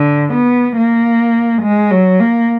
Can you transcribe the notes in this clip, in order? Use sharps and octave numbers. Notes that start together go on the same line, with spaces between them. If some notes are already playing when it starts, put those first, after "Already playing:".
Already playing: D3
B3
A#3
G#3
F#3
A#3